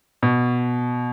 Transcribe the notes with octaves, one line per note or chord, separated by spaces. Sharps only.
B2